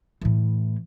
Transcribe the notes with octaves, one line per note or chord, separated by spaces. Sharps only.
A2 E3